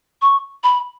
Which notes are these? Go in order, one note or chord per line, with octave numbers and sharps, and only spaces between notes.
C#6
B5